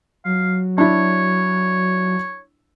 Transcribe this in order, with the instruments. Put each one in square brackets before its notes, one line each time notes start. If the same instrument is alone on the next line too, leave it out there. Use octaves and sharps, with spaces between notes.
[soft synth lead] F#3 [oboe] F5
[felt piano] D4 E4 [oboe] C#5